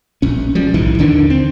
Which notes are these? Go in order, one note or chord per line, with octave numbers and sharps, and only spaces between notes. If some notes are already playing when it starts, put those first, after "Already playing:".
A#1 C#4
F3 G3
B1 A2 D#3 E3
D#2 D3 D#3 D4
C4